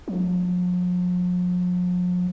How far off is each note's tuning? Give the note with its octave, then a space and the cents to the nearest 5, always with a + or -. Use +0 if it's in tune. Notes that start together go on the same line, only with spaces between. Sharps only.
F3 +45